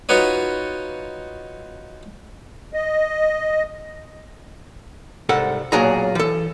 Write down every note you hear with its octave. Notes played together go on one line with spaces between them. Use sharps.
D#4 F4 F#4 B4 C#5 D#5
D#5
C2 G#2 A4 F#5
B1 A#2 F#3 G#4 A#5
E3 A4